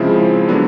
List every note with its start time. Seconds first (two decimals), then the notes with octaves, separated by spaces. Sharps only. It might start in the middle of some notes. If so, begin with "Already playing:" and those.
Already playing: C#3 F3 G#3 C4 E4
0.48 D3 F#3 B3 D4